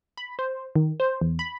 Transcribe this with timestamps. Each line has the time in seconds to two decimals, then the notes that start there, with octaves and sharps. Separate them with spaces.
0.17 B5
0.39 C5
0.76 D#3
1.00 C5
1.21 E2
1.39 B5